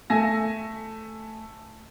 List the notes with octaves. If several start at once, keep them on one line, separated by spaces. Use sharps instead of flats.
A3 E5 G#5 A#6